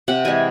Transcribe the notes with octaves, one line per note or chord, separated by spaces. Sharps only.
C3 F#5
E3 G#3 G#5